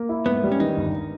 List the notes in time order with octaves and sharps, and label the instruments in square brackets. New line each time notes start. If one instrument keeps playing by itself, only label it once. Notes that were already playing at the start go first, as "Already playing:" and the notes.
Already playing: [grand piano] A#3
E4
[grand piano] G#2 [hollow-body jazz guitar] B3
[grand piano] G3
[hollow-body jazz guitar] C#4
[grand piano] D#3 [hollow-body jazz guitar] D#4
[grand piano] G1